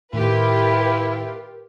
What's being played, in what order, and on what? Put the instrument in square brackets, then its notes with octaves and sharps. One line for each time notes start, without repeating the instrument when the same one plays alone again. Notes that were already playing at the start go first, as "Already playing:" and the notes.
[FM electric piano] A2 D#3 [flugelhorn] E4 [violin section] F4 G4 B4 [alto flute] A#4